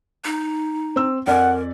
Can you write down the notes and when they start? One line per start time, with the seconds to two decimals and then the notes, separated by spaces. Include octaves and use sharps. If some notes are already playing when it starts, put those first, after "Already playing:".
0.24 D#4
0.96 C4 E6
1.27 F2 A#4 D5 F#5 G#5